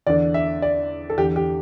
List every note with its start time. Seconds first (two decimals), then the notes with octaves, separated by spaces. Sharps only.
0.07 E2 D3 D5
0.34 E5
0.62 D5
1.10 A4
1.18 E2 D3 G4
1.36 G4